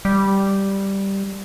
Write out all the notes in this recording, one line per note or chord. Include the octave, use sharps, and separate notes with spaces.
G3